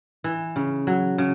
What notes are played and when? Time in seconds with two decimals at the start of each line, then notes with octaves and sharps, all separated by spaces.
0.24 E3
0.56 C#3
0.87 F#3
1.18 C#3